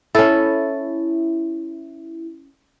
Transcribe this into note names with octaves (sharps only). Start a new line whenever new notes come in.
C#4 E4 A4